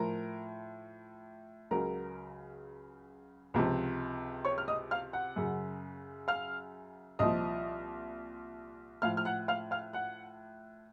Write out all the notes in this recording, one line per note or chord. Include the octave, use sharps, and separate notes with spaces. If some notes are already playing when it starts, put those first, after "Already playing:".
Already playing: A2 F3 A#4 A#5
C#2 C#3 F#3 A#4 A#5
C#2 C3 F3
C#5 C#6
F6
D#5 D#6
F5 F6
F#5 F#6
F#2 C#3 F#3
F5 F6
C2 A#2 F3 D#5 D#6
A2 F3 F5 F6
F6
F#5 F#6
F5 F6
F5 F6
F#5 F#6